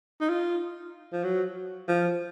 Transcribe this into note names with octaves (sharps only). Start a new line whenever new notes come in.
D#4
F4
F3
F#3
F3